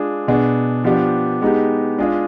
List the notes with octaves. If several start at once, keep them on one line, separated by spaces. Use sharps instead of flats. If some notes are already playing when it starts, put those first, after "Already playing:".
Already playing: G#3 D4 F4 G#4
B2 B3 D4 G#4
F3 B3 D4 G4
G#3 B3 D#4 G4
G#3 D4 F4 G#4